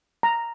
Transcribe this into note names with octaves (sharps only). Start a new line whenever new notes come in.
A#5